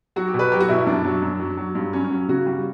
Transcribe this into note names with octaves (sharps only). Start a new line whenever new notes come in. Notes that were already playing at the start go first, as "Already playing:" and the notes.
F#3 F#4
G4
B2
B4
F#3 G4
F#4
B2 E4
E4
F#2 D4
F#3
F#2
F#3
F#3
G2
F#3 C#4
C#4
F#3
C#3 F#4
G3 F#4